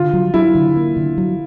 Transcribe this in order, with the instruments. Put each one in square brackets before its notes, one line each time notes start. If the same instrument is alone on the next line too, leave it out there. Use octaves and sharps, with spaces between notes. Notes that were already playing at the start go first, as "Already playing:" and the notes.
Already playing: [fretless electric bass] D3 [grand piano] F4
[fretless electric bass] F#3
[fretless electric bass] F#3 [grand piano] E4
[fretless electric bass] D3
A#3
D3
F#3